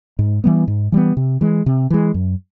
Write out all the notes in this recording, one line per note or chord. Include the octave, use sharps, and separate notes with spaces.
G#2
E3 G3 B3
G#2
E3 G3 B3
C3
E3 G#3
C3
E3 G#3
F#2